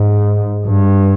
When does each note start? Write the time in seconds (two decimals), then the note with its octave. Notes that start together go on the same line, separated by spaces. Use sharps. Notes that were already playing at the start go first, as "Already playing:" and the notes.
Already playing: G#2
0.66 G2